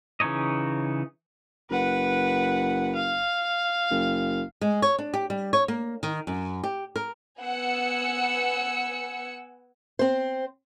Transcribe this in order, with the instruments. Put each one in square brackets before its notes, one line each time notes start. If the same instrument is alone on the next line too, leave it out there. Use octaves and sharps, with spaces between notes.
[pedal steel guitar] C#3 E3 D#4 C#5 D#5
[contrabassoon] F#1 [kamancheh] B4 F#5
[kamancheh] F5
[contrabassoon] F#1
[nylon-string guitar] G#3
C#5
D4
G4
G3
C#5
A#3
D#3
F#2
G4
A#4
[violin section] B3 F#5 G#5 E6 C#7
[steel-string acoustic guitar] C4 C5